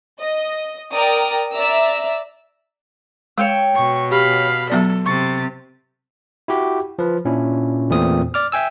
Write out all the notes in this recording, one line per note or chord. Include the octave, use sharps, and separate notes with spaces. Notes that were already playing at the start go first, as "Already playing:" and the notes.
D#5
A#4 D5 G5 A#5 D#6
D5 E5 A#5 E6
G#3 C#5 F5 G5 E6
B2 C#6
G4 F5 B5
F#3 B3 A4 D5
C3 C#6 A6
E4 F#4 G4
F3 B4
A#2 C#4 D4 E4
E2 A#2 E3 A3 C4 D#6
D5 D6 F6
E5 G5 G#5 E6